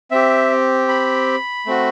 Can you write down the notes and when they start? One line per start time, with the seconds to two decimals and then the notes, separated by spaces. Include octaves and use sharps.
0.11 C4 G4 E5
0.88 B5
1.66 A3 C4 F#4